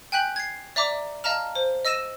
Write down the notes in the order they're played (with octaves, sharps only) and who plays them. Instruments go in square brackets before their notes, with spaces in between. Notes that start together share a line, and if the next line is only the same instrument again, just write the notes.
[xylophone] G5 G#5 F#6 G6 B6 F#7
G#6 C7
D5 E5 A#5 D6
D#5 F5 A5 A#5 F6
C5
D#5 E6 A#6 D#7 E7